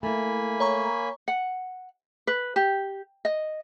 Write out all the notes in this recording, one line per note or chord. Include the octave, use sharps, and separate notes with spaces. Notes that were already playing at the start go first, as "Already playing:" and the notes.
A3 A#3 E4 G#5 B5
C#5 A#5 C#6
F#5
B4
G4
D#5